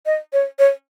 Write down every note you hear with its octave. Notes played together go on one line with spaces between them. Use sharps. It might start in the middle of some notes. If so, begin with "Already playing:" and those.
D#5
C#5
C#5